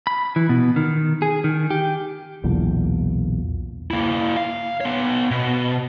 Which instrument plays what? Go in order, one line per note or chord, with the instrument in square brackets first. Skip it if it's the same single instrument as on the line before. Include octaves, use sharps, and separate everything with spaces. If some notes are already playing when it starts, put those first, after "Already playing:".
[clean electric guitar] B5
E3
B2
D#3
G#4
D#3
G4
[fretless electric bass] B1 E2 A#2 D3
[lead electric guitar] A#3 E4
F5
B3 C#5
B2